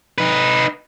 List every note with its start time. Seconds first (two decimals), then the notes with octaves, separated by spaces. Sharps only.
0.18 D#4 B4